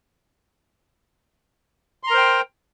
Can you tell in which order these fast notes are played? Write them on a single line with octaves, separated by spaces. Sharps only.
C6 A#5 A#4 C5 G5